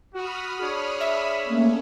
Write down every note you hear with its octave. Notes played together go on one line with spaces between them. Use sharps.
F#4 B5 D#6 F6
D4 G#4 C#5
E5
A3 A#3 C#4